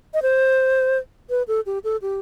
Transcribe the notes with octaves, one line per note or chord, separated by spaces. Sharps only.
D#5
C5
B4
A4
G4
A4
G4